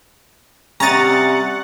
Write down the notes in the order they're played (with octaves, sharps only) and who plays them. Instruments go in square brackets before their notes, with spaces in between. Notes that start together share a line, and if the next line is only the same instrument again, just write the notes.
[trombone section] C3 G3 [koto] C#4 D#5 [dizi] F#5 [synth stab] A#5 A6